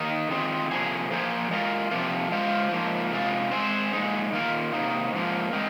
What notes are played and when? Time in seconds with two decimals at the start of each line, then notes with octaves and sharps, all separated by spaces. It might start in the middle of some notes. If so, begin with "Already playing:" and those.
Already playing: D#3 A#3 D#4 A#4 D#5
0.30 D#3 C4 F4 G#4
0.71 C3 F3 A#3 G#4
1.10 F3 A#3 G#4 C5
1.51 G#3 F4 A#4
1.91 C3 F3 A#3 F4
2.32 G#3 F4 C5 F5
2.71 G#2 F3 A#3
3.11 C3 G#3 F4
3.51 G#3 C4 G#4 C5
3.93 A#2 G#3 D#4
4.32 D#3 A#3 F4 A#4
4.73 C3 D#3 A#3 D#4
5.12 G#2 F3 A#3
5.53 G#3 C4 D#4 A#4